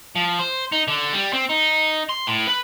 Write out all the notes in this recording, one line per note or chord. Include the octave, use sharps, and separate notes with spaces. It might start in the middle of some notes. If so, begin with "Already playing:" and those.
F3
C5
D#4
D3
G3
C4
D#4
C6
A2
B4